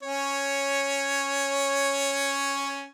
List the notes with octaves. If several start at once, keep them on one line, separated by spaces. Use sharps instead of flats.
C#4 C#5